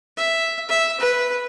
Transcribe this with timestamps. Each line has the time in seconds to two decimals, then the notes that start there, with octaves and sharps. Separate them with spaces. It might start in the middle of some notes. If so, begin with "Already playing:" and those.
0.17 E5
0.69 E5
1.00 B4